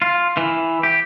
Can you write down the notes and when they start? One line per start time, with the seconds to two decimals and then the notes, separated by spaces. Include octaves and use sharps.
0.02 F4
0.37 E3
0.83 G4